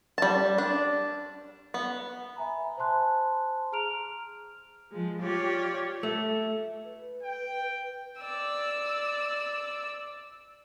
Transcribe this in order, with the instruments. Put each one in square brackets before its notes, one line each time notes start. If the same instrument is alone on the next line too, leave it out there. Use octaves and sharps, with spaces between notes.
[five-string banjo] G3 A5
D4
B3
[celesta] E5 G#5 A#5 B5
C5 G#5 A5 C6 F#6
G#4 A#5 F6 D7 F7
F6
[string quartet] F3 G#3
F4 G4 C#5 D5
[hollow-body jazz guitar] A3
[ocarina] B4
[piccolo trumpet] G5
[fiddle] D5 E6